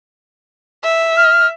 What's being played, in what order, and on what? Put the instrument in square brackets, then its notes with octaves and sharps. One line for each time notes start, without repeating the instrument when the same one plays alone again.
[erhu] E5
[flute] F6